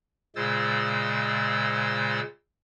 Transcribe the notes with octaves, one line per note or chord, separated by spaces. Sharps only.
A#2 C#3 G#3 C5 E6 A6